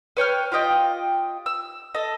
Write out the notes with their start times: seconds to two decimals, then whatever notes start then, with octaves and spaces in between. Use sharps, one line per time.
0.17 B4 C#5 G5 F6
0.52 F4 G4 D#5 G5
1.46 E6
1.95 A4 D#5